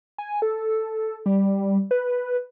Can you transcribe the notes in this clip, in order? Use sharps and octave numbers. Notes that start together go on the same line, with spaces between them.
G#5
A4
G3
B4